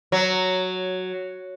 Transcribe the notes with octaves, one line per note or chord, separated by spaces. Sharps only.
F#3